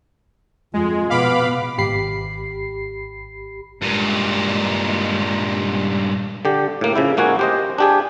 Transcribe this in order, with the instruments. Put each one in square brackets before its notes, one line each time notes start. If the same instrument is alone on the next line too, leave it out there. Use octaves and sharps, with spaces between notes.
[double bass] F2 [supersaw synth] G#3 [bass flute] F4
[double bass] B2 [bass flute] B3 [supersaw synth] F5 B5 D6
[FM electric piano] G#1 G4 B5 C7
[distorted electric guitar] G2 A#2 [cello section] G#3
[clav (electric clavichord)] D3 G4
A2 A#3
C#3 F3 E4
G#2 A#3 F#4 F#5 G#5
G4 C5 D#5
D4 G4 G#4